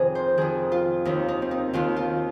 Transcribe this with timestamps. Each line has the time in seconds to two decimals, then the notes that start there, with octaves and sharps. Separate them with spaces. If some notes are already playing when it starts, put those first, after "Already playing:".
Already playing: F2 C3 D#3 G#4
0.15 C5
0.37 F2 D#3 G#4
0.72 F4
1.05 D#2 D#3 D#4
1.28 D#4
1.42 C4
1.51 D#4
1.73 D#2 D#3 F4
1.97 F4